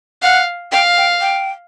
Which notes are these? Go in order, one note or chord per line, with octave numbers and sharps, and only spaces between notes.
F5 F#5
F5 G5
G5
G5